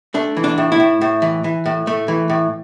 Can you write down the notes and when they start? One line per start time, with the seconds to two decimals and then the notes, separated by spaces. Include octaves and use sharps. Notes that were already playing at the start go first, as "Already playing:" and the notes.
0.14 A3 D4
0.37 E3
0.44 D4
0.58 A2
0.72 E4
0.80 A2
1.01 A2
1.22 E3
1.44 E3
1.66 A2
1.87 A3
2.08 E3
2.30 A2